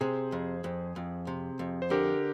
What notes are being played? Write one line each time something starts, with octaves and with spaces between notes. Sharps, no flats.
C3 G#4 C5
F2
F2
F2
C3
F2
C5
D3 G4 A#4